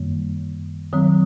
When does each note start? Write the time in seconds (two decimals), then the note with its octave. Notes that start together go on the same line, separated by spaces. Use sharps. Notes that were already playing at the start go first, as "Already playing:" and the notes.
Already playing: F#2 D#3 G3 A#3
0.93 D#3 F#3 C4